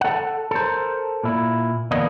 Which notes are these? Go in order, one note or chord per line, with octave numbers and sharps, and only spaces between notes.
A4 F#5
A4 A#4 C5
A#2 E4
E2 D3 A#3 B3 D4 D#5